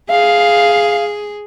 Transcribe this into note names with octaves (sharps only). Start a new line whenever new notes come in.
G#4 F5